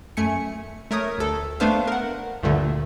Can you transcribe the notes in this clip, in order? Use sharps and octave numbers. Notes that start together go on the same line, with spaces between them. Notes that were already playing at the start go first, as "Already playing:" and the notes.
F#2 A3 G#5 C#7
A3 A#4 C#5 D#6
D2 A4
A3 B3 D4 B4 C5 F5
A#4 F#5
D2 G2 A#2 D3 A3